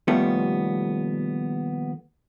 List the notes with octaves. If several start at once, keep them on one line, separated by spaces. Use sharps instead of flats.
D#2 B2 F3 G3 A3 B3